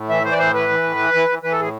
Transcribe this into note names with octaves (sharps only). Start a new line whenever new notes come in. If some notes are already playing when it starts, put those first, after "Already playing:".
Already playing: A2
E3 E5
E3 C5
D5
A2 C5
E3 B4
E3
A2
E3
E3
E3
E3 B4
A4
A2 G#4